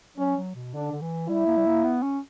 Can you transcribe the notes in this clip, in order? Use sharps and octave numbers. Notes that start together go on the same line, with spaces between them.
F#3 C#4
F#3
B2
D3 D4
D3
E3
G3 E4
A#3
G3
A#3
B3
C#4